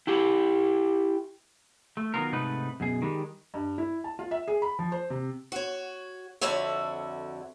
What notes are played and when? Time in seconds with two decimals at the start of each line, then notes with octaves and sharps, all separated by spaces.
0.07 E4 G4
1.97 A3
2.14 D#3 F#3 B3 F4 A#4
2.32 G#2 C3 A3 D#4 B4
2.80 F#2 B2 G#4
3.02 D#3 G3 G#3
3.54 G2
3.78 E4
4.04 A5
4.19 F4
4.31 E5
4.48 G#4
4.62 B5
4.79 F3
4.92 C5
5.10 C3
5.52 F#4 C#5
6.41 F2 D3 F#4 C#5 E5